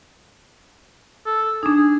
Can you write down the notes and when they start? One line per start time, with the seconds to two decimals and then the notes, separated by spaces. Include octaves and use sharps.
1.26 A4
1.63 D4 D#4 G#4
1.76 G#4